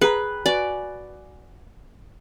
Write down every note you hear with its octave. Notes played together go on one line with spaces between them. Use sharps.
G#4 B4 G5 A#5
F#4 B4 D5 G#5